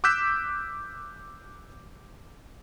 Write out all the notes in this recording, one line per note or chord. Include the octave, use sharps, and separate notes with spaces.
D6 E6 F#6 G6 B6 E7